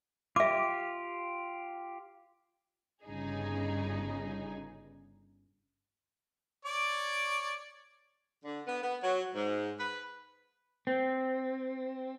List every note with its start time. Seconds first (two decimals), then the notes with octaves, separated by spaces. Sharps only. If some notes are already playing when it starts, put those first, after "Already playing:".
0.36 F4 G4 E5 D6
3.05 G1 G2 C#3 D#4 G#4
6.65 C#5 D5 D6
8.44 D3
8.66 B3
8.82 B3
9.02 F#3
9.35 G#2
9.78 B4
10.87 C4